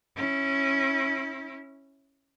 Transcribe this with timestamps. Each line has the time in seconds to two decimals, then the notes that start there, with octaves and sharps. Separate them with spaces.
0.16 C#4 E4